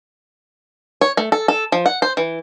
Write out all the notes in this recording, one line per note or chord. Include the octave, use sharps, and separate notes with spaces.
C#5
A3
A4
A4
F3
F#5
C5
E3